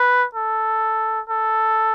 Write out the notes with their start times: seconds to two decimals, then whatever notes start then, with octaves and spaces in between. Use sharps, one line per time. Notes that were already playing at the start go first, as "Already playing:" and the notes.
Already playing: B4
0.35 A4
1.30 A4